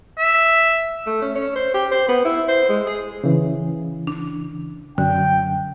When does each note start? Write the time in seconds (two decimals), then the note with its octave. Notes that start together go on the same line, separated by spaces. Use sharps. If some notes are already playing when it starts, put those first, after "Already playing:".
0.18 E5
1.06 A3
1.22 C#4
1.35 C#4
1.56 C5
1.74 G4
1.92 C5
2.08 B3
2.25 E4
2.48 C5
2.69 G#3
2.87 G#4
3.24 C#3 E3
4.07 D4
4.98 F#2 D3 G5